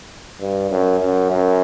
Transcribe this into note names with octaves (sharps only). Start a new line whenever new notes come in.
G2
F#2
F#2
F#2